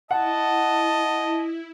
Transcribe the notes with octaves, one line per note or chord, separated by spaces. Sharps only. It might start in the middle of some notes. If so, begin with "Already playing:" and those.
E4 D#5 F#5 A5